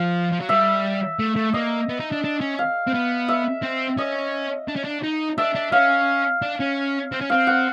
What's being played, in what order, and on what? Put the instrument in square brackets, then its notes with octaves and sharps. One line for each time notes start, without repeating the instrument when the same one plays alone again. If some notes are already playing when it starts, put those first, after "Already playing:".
Already playing: [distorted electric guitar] F3 [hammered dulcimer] F5
[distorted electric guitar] F3
F#3
[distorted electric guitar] G3 [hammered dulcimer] E5
[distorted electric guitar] A3
A3
[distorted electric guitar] A#3 [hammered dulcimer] D#5
[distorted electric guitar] B3
D#4
D4
D4
C#4
[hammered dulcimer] F5
[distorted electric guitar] C4
B3
[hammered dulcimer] E5
[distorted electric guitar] C4
[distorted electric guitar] C#4 [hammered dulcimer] D#5
[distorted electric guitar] D4
C#4
D4
D#4
[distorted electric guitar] D4 [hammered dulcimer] E5
[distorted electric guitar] D4
[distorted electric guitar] C#4 [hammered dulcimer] F5
[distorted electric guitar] D4
C#4
C4
C#4
[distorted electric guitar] C4 [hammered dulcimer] F5
[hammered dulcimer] F#5